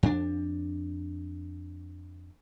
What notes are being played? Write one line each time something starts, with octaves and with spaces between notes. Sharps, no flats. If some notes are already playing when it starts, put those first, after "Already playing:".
F2 D4